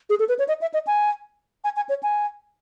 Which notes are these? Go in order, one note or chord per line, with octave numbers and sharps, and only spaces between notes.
G#4
A4
B4
C#5
D#5
E5
D#5
G#5
G#5
G#5
C#5
G#5